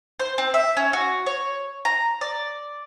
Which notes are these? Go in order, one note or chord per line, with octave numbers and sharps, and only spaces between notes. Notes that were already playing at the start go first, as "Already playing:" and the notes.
C5
C4
E5
C#4
F#4
C#5
A#5
D5